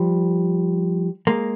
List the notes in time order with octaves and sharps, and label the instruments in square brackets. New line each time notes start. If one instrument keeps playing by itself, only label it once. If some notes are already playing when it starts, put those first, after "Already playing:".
Already playing: [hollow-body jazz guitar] F3 G3
G#3 A#3